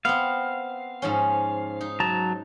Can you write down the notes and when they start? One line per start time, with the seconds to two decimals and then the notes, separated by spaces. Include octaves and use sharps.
0.05 B3 C4 F5
1.02 G#2 F3 C#4
1.81 D#4
2.00 F#3 A5 A#5